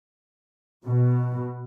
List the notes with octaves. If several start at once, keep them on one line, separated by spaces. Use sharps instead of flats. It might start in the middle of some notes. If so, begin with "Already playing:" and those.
B2